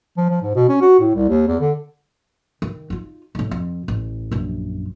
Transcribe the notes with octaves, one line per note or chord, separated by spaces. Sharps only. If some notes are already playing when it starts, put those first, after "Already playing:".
F3
F3
G#2
B2
C#4
F#4
A2
C2
D#2
E2
D3
D#3
D#4 F4
A2 D#3
F2
A1
A#1 F#2